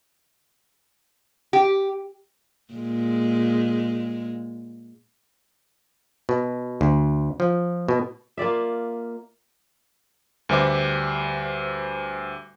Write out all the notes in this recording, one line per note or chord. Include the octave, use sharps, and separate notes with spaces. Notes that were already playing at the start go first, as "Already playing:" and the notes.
G4
A#2 G#3
B2
D2
F3
B2
A#3 F4 D5 E5
D2 G3 B4 C5 E5 D6